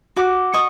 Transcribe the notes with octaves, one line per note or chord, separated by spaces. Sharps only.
F#4 D6
D#5 C#6